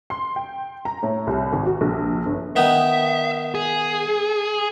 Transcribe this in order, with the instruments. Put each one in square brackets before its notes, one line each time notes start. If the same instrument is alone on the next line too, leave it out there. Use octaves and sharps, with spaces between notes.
[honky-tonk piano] C6
G5
A#5
A2
C2
G#1
F#4
A#1
G1
[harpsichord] D#3 B3 D#4 [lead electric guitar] E5
[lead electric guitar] G#4